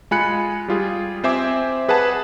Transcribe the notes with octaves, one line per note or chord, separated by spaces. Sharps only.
G#3 F4 G#5 B5 F#6 C#7
G3 F4 G#4
C4 C5 E5 G#5 D6
G#4 B4 F#5 G#5 A5